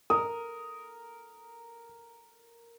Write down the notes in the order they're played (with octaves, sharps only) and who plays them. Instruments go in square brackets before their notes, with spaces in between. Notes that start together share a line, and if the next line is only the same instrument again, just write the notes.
[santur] A#4 [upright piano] D#6